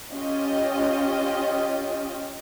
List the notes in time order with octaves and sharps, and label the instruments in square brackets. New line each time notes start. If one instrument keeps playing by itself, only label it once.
[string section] C#4 F4 G4 D#5